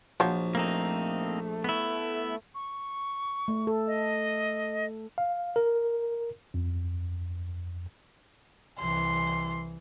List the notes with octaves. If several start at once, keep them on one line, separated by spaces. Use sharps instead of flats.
A#1 F3 F#3
A3 A#3 C4 D#4
B3 E4
C#6
A3
A4
D#5
F5
A#4
F2
C2 E3 C6